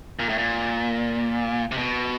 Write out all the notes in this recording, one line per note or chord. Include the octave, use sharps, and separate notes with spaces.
A#2
A2
A#2
C3
B2